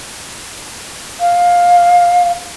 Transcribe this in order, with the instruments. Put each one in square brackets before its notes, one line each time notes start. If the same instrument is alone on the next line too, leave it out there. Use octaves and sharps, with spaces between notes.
[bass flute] F5